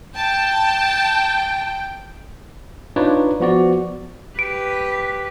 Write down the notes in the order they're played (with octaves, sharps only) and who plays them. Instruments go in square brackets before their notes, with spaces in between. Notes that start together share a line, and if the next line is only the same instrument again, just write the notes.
[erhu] G5 [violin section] A5
[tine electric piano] D4 D#4 F4 B4 C#5 D5
F3 B3 F#4 D5
[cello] G4 B4 [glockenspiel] D7